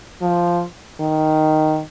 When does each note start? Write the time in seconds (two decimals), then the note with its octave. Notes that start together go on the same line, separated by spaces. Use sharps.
0.21 F3
1.00 D#3